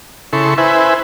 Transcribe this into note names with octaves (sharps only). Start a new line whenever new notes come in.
C#3 E4 A4 C6 C#6
E4 B4 C5 E5 G#5